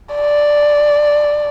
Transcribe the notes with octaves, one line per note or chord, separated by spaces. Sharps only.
D5